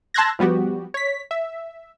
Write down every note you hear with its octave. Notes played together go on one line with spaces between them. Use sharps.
A5 C6 E6 F#6 G#6 A#6
F3 G3 B3 F#4 G4
C#5 B6
E5